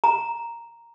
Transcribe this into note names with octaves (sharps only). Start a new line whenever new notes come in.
A#5